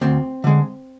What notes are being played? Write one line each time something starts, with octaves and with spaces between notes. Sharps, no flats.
D2 C4
D3 G#3